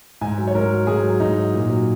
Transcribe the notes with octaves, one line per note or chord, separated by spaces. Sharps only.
G#2 G#5
F#3
C#5
G#2 A#4
F#3
G#2 G#4
F#3
G#2 D#4
F#3
A#2
F#3